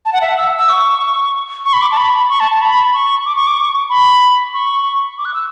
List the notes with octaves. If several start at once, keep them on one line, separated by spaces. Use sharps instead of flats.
A5
F#5
E5
F#5
E6
E6
C#6
C#6
B5
D6
A5
B5
C#6
A5
A5
B5
C#6
D6
C#6
D6
C#6
B5
C#6
D6
F#6
E6